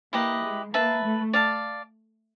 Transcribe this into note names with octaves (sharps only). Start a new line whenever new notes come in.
A#3 E4 G4 B4 D#5
G#3
A#3 B4 E5 A5
A3
D5 F5 A5